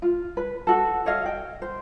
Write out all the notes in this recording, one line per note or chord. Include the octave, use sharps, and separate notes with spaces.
F4
B4
F#4 A4
A4 C#5 D#5 F5
G5
C5